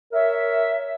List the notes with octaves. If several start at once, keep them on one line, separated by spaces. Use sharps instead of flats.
A#4 C#5 E5